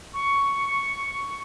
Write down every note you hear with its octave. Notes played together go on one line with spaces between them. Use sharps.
C#6